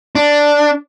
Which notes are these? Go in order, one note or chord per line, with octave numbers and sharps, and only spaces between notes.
D4